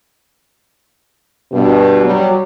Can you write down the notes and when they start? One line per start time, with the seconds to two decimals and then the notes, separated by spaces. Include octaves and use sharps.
1.52 G2 B2
2.05 F#3 G3